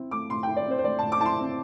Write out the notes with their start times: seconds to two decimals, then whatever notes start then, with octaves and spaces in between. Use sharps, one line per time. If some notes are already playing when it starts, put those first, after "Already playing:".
Already playing: C4 E4
0.11 A3 D6
0.30 A2 C6
0.43 G5
0.47 E4
0.56 D5
0.66 C4 C5
0.78 C5
0.84 A3 D5
0.99 A5
1.03 A2
1.12 D6
1.20 E4 A5
1.26 C6
1.40 C4